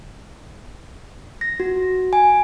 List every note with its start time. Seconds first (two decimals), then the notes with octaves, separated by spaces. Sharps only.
1.41 A#6
1.60 F#4
2.13 G#5